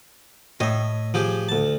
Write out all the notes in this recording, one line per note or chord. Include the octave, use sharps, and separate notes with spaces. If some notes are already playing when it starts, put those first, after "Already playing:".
A2 D#5 E5
F3 G4 G#4
D2 A5